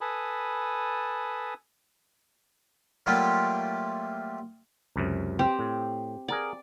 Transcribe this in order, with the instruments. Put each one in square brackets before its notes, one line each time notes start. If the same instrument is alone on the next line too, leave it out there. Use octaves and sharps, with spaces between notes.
[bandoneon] A4 B4 G#5 A5 B5 D#6
[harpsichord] F#3 G3 A3 A#3 F4 G4
[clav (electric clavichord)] C#2 F#2 C3
[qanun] C4 G4
[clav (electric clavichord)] A2
[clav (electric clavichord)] G#4 A#4 F#5 [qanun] D5